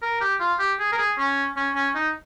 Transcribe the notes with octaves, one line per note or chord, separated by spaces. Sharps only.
A#4
G4
F4
G4
G#4
A#4
G#4
C#4
C#4
C#4
D#4